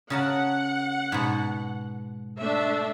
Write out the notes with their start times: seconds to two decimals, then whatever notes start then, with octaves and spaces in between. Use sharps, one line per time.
0.10 C#3 A#4 F#5 A5
1.12 G#2 B2
2.39 A3 D4 E5